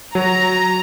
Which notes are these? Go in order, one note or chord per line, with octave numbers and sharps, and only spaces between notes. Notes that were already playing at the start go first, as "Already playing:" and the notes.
F#3 A#5